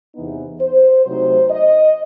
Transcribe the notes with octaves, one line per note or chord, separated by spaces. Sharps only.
E2 C3 E3 B3 D#4
C5
C3 F#3 A3 D#4 C5
D#5